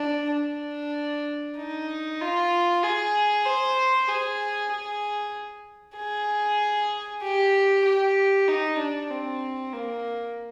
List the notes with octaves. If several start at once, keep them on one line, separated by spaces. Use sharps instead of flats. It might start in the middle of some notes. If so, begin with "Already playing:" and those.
Already playing: D4
D4
D#4
F4
G#4
C5
G#4
G#4
G#4
G4
G4
D#4
D4
C4
A#3